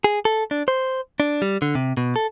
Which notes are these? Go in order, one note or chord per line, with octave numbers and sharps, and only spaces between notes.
G#4
A4
D4
C5
D4
G3
D3
C3
B2
A4